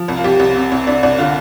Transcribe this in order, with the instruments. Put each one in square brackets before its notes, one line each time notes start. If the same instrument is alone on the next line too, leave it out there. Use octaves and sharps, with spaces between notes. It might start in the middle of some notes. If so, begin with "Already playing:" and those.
Already playing: [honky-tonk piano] F3
C2
F4
C2 G4
C2
C3
C2
C2 D4
C2 D4
D3 F4